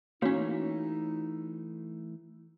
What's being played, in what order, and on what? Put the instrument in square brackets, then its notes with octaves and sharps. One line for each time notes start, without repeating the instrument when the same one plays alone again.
[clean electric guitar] E3 A3 [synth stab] A#3 C#4 [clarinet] D#4 [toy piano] F#4 C#5 F5